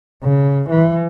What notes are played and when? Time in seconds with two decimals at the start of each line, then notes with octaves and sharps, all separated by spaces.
0.23 C#3
0.70 E3